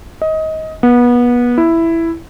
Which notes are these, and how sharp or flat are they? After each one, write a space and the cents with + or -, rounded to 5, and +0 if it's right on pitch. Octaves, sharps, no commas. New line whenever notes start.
D#5 +20
B3 -25
E4 +5